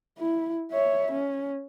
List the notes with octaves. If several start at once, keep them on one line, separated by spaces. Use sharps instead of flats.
E4
C#5 E5
C#4